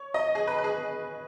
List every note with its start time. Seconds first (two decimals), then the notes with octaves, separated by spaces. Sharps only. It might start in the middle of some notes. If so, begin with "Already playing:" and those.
Already playing: C#5
0.14 D#5
0.35 G#4
0.47 B4
0.58 B4
0.64 G#4